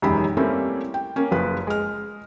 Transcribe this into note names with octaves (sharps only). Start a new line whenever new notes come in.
E1 F#2 D#3 G4 A#5 B5
G3 A3 A#3 C4 C#4 E4
G5
A#3 C#4
F#1 F3 B4
G#3 F6